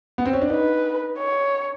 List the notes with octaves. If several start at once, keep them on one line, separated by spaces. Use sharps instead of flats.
B3
C4
C#4
D4
D#4 B4
C#5